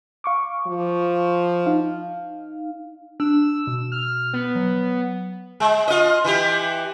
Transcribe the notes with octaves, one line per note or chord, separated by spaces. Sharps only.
F5 C#6 D6
F3
D#4 F5
D4 E6
B2
F6
B3
F#3
G#3
F4 D#5
E3 G4